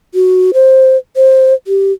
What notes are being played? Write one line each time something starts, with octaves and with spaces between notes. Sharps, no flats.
F#4
C5
C5
G4